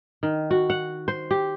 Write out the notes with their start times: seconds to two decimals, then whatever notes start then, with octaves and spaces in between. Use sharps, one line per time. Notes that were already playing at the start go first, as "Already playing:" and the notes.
0.23 D#3
0.51 F#4
0.70 F#5
1.08 C5
1.31 G4